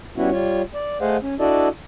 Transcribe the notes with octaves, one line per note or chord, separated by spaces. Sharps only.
G3 B3 C#4 E4 F#4
G3 F4 C#5
D5
A3 G#4 C5 D#5 F5 F#5
C#4
D4 E4 F#4 A4 D5 D#5